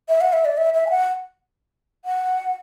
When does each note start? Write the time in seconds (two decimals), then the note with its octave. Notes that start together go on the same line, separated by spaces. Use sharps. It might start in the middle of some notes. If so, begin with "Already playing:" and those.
0.09 E5
0.21 F#5
0.33 E5
0.45 D5
0.57 E5
0.74 E5
0.87 G#5
0.90 F#5
2.05 F#5